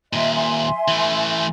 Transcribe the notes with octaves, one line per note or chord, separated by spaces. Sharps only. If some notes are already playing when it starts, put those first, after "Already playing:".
D#2 A#2 D#5 E5 C6
E5 G#5 C6
E3 A3